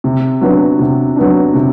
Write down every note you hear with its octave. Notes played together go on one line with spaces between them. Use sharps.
C3
F#3 B3 D4
C3
F#3 B3 D4
C3